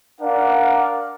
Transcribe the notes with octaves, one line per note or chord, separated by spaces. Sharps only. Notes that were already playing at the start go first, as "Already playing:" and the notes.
D4 A#4 D5 F5 F#5